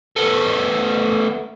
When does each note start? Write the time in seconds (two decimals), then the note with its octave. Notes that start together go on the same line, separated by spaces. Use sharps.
0.16 A3 B3